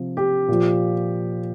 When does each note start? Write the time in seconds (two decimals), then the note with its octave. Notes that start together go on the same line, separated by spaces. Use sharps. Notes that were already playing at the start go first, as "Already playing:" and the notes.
Already playing: C3 F3
0.17 G4
0.48 A#2 F3